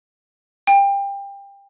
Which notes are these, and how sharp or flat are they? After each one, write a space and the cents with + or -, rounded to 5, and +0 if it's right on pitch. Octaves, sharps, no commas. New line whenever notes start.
G5 +25